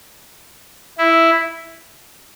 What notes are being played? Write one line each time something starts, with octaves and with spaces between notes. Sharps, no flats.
E4